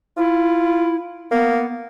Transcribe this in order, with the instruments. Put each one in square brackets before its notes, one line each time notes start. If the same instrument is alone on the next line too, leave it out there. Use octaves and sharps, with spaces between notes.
[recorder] E4 [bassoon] F4
[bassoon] A#3 [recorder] B3